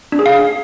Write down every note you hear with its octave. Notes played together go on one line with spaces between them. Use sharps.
D4
G#4
F5